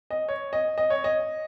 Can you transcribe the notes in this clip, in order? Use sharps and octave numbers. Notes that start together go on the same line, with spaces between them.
D#5
C#5
D#5
D#5
C#5
D#5